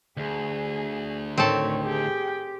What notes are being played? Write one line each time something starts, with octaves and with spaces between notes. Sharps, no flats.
D2 G#4
A2 D#3 C4 A4 C#5
G4 G#4 G5